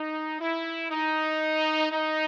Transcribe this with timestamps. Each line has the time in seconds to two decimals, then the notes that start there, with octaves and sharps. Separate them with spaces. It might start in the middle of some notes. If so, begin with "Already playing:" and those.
Already playing: D#4
0.40 E4
0.90 D#4
1.91 D#4